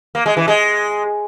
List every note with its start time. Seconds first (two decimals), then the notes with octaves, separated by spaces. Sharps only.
0.15 A#3
0.26 G#3
0.37 E3
0.48 G#3